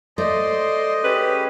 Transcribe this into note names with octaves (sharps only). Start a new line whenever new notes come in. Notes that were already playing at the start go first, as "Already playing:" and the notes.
A3 C5 D5 D#5 C6
C#4 G4 G#4 B4